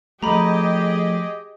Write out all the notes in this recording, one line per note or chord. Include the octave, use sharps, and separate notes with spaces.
F3 A3 G4 G#4 D#5 A#5 B5